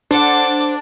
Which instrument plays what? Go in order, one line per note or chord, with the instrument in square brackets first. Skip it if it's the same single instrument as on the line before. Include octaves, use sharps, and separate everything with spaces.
[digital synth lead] D4 [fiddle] A4 D6 [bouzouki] C5 F#5